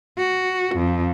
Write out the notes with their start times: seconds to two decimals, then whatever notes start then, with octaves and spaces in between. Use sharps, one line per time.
0.18 F#4
0.75 F2